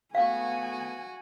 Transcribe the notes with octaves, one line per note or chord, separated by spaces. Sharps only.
A3 B3 F#4 F5 G#5 D6